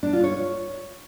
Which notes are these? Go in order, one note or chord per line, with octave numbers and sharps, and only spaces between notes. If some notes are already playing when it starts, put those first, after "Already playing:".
D4
F4
C#5